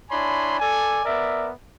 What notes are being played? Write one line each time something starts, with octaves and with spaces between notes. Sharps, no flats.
D4 E4 C#5 G#5 B5 C6
A4 D5 G#5
B3 A#4 D5 E5